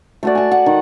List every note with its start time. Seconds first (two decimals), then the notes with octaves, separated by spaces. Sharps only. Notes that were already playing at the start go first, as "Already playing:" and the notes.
0.23 A3 F#4 D5
0.35 G#5 A5
0.52 F#5
0.66 D#3